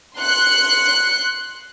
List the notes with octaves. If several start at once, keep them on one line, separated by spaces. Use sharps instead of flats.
C6 F#6 C#7